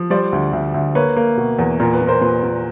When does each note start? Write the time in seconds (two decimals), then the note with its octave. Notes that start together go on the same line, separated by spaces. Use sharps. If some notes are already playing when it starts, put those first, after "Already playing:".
Already playing: F3
0.10 G3 C5 D5
0.33 D2
0.53 D2
0.74 D2
0.95 A#3 B4 C#5
1.16 A#3
1.37 B2
1.59 E2
1.80 A#2 A#4
1.94 B4
2.01 A#2
2.07 A#4 C5
2.21 A#2 B4
2.43 A#2